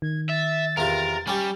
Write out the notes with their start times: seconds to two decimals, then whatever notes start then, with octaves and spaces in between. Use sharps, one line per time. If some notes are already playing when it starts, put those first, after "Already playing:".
0.02 D#3 G#6
0.29 E5 A6
0.77 E2 C3 F4 A#4
1.28 G3 C#4 G4